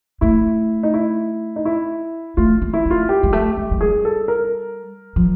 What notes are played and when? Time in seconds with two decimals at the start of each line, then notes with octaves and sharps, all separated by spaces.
0.21 A3 E4
0.83 D#4
0.94 E4
1.56 D#4
1.65 E4
2.37 A3 F4
2.62 A#3
2.73 E4
2.86 A3 F4
3.09 G4
3.23 G#3
3.33 A3
3.57 G#3
3.71 G#3
3.81 G3 G#4
4.05 A4
4.28 A#4
5.16 F3